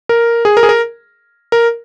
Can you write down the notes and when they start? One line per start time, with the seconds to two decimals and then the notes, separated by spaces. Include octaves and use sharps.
0.09 A#4
0.45 G#4
0.57 A#4
0.63 G#4
0.69 A#4
1.52 A#4